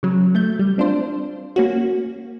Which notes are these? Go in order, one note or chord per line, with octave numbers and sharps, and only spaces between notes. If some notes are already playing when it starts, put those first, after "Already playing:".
C#3 F#3
A3 G6
G3
C4 D4 F4 C5
A#3 C#4 F#4